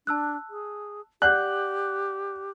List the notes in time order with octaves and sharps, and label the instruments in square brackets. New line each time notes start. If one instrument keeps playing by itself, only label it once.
[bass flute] D4 [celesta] A5 E6 F#6
[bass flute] G#4
[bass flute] G4 [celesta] D5 F#5 G6 [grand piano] F#6